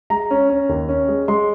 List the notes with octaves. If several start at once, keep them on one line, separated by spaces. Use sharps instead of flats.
G#3 A#5
C#4
C#4
D#2
C#4
G#3
G#3 C6